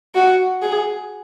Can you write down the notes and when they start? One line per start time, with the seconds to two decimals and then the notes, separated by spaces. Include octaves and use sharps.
0.15 F#4
0.62 G#4